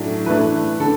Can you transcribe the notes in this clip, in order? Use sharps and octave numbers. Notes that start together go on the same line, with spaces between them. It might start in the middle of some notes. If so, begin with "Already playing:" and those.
Already playing: A2 F#3 D4
E3 A3 D4 B4
D3 A4